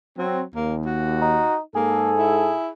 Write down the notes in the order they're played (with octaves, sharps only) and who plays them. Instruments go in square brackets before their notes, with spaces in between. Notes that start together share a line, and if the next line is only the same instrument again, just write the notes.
[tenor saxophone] F#3 [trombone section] C4
[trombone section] D#2 [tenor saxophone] A#3
[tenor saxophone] F#4
[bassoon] D#4
[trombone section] G#2 A4 [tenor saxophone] A#3 [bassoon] G#4
[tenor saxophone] E4